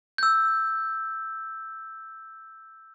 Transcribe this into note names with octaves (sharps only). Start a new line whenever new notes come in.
E6 G6